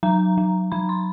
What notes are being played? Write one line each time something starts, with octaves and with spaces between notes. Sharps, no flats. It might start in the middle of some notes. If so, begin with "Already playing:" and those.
F#3 A#5
F#3
F#3 B5
C6